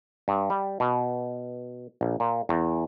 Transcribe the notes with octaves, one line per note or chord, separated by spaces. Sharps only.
G2
G3
B2
A#1
A#2
E2